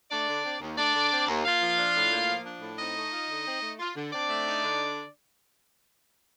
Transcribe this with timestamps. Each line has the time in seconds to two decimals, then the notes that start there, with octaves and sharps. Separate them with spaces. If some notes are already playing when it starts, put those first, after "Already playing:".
0.10 A3 D4 D5
0.28 D3
0.44 C4
0.61 D#2
0.77 A3 D4 D5
0.94 D3
1.11 C4
1.27 D#2
1.44 A#3 F4 F5
1.60 F3
1.78 D4
1.94 A2
2.11 A#3
2.28 F3
2.45 D4
2.61 A2
2.78 C4 D#4 D#5
2.95 A3
3.12 F4
3.28 D3
3.46 C4
3.62 A3
3.79 F4
3.96 D3
4.12 C4 D4 D5
4.28 A3
4.46 D#4
4.63 D3